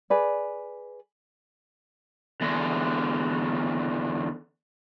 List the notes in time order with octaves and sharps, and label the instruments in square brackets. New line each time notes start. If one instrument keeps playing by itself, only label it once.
[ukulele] G#4 B4 D5
[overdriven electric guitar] E2 D3